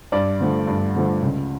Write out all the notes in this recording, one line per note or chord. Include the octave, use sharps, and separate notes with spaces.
G2 D5
D3 F3 A3
G2
D3 F3 A3
C#2